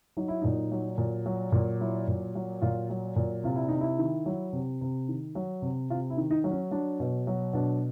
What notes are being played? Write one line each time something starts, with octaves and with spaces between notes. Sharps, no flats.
F#3 D#4
E4
A#2 D#4
F#3
A#2
F#3
A#2
F#3 E4
A#2
F#3
A#2 F4
F#3
A#2
C3 F4
E4
C3 D#4
E4
D#3
F#3
C3
C3
D#3
F#3
C3
C3 F4
E4
D#3
D#4
F#3
C#4
F#3 D4
B2
F#3
B2 D4